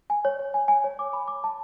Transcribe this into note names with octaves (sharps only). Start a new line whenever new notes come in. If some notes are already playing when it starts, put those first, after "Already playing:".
G#5
C#5
C#5
G#5
G#5
C#5
D6
B5
D6
A5